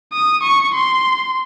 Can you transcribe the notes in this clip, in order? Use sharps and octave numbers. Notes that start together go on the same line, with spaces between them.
D#6
C#6
C6